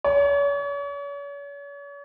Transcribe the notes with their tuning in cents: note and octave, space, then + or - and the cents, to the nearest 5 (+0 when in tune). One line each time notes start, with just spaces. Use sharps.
C#5 +40